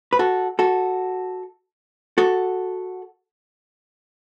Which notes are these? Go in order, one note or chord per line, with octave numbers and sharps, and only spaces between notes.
B4
F#4 A4
F#4 A4
F#4 A4